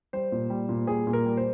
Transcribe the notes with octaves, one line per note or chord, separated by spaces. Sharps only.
G3 C5
A#2
G3
A#2
G3 G#4
A#2
A#4
G3
C5